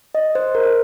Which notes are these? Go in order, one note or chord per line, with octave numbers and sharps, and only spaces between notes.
D#5
C5
A#4